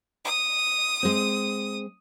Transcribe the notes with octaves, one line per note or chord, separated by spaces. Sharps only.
D#6
G#3 C4